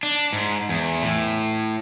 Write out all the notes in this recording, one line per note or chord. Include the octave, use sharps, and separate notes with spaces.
D4
G#2
E2
A2